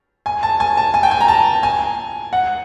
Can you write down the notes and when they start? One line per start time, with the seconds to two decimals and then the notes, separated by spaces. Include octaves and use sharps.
0.26 G#5
0.43 A5
0.60 G#5
0.77 A5
0.94 G#5
1.03 G5
1.11 G#5
1.21 A#5
1.28 A5
1.63 G#5
2.33 F#5